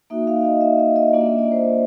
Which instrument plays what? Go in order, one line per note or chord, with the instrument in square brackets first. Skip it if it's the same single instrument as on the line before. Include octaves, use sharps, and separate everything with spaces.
[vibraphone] A#3 D#4 F#4 E5
F5
D#5
E5
E5
D#5
A#3 D4 F4 D5
E5
D#5
D5
C5